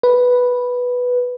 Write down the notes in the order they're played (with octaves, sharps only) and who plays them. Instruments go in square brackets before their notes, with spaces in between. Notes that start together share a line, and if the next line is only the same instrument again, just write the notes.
[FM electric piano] B4